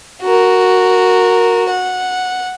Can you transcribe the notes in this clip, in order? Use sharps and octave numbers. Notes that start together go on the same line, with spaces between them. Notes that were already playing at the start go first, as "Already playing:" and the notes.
F#4 A#4
F#5